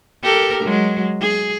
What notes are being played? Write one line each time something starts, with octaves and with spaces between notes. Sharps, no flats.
G4 A4 A#4
F#3 G#3
G#4